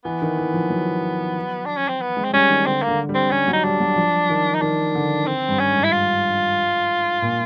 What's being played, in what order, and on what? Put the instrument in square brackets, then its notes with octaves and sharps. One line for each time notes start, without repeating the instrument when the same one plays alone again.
[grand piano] E3 [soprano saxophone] B3
[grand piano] D#3
E3
F3
F#3
[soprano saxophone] D4
C#4
C4
B3
[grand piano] G#3
[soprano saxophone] C4
[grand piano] G3 [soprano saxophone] C#4
[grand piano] D#3
[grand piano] D3 [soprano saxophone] C4
[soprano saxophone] A#3
[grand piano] D3
G3
[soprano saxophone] C4
[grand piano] G3 [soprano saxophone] C#4
[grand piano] F#3
[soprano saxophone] D#4
[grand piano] G3 [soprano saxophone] D4
[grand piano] F#3
F3
D#3
[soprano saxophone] D#4
[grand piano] D#3 [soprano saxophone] D4
[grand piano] D3
[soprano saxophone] C4
[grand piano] G2
[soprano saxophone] C#4
[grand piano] G#2
[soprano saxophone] E4
F4
[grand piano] A#2